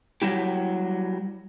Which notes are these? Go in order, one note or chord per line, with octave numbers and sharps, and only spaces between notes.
F#3 G3 E4 G4